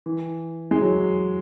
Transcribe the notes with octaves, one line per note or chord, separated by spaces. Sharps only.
E3
G#3
F#3